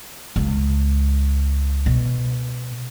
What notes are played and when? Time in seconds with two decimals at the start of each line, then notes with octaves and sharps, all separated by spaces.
0.36 C#2
1.86 B2